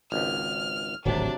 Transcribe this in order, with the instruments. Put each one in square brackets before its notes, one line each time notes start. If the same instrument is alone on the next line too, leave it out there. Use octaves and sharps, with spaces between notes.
[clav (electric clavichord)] G#1 C#2 [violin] F6
[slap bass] D1 G#1 [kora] C3 F#3 [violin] D4